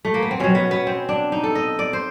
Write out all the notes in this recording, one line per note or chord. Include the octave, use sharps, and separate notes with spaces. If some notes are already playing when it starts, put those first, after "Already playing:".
A3
A#3
B3
C4
B2 F#3 C#4
B3
B3
C4
D4
D#4
A4
D#5
D5
C5